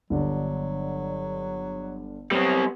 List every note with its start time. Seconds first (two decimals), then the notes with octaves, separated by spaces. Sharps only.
0.10 G1 D3 F#3 D4
2.31 F#3 G3 B3 C4